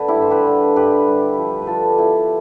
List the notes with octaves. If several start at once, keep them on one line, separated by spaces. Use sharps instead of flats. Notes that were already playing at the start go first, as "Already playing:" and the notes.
Already playing: D3 A4 B4
E4 G4
G2
C5
G4 B4
D3
G2 G4 B4
G2
F3
B4
F3 F4 A4
B3 E4 G4